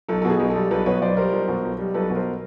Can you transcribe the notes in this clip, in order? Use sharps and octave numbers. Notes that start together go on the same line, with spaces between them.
B1 A4
A4
B2 G#4
B1
A4
G3
B1 A4 B4
B2 B4 C#5
B1 C5 D5
G3 A#4 C5
B1
B2
B1
G3
B1 A4 B4
B2
A#4 C5